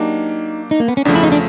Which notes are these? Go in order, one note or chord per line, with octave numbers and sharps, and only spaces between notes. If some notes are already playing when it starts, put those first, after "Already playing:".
Already playing: F#3 A#3 D4 D#4 G4
D#4
A#3
B3
C#4
E2 C#3 F3 A3 D4
E4
D#4
D4